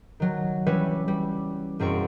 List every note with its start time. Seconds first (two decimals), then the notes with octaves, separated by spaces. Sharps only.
0.20 D#3 F#3
0.66 E3 G3 C#4 B4 C#5 E5
1.08 G3
1.79 E1 F#2 C4 C#6 D7